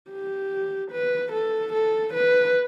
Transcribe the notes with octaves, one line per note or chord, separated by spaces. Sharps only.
G4
B4
A4
A4
B4